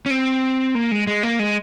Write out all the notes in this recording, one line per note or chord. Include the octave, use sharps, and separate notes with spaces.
C#4
C4
A#3
G#3
G#3
A#3
G#3